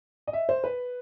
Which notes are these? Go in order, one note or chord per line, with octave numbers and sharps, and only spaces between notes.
D#5
E5
C5
B4